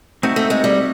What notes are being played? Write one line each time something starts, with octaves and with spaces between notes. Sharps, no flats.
A3 C4 D#4 F#4
A3
G#3
G3